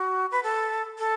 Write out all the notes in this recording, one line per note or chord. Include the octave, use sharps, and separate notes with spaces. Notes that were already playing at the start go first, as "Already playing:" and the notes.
Already playing: F#4
B4
A4
A4